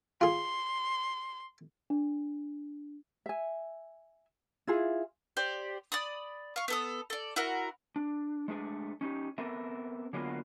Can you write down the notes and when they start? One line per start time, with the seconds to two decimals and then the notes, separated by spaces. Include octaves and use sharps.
0.21 F4 G#4 C6
1.90 D4
3.26 E5 G#5
4.67 E4 F4 G#4
5.37 G4 C5 D5
5.92 D5 B5 D#6
6.56 F5 C#6
6.68 B3 A4 D#6
7.10 A4 D5
7.36 E4 F#4 A#4 F#5
7.96 D4
8.48 G#3 A3 D4 G#4
9.01 C#4 D#4 G4
9.38 B3 C4 A4 A#4 E5
10.13 D3 F#3 G#3 A#3 B3 F4